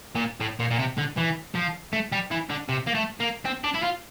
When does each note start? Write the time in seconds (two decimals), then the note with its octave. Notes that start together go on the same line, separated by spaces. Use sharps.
0.15 A#2
0.41 A2
0.60 A#2
0.71 A#2
0.79 C3
0.98 D3
1.17 E3
1.55 F3
1.93 A3
2.12 G3
2.31 E3
2.50 D3
2.69 C3
2.87 A#3
2.95 A3
3.20 A#3
3.45 C4
3.64 D4
3.75 E4
3.83 F4